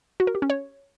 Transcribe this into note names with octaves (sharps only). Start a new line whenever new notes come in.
F#4
A#4
G4
C#4
C#5